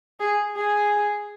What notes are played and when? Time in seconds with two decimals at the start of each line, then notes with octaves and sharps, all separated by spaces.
0.20 G#4
0.56 G#4